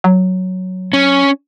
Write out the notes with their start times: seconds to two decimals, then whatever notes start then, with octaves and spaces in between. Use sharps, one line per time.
0.04 F#3
0.93 C#4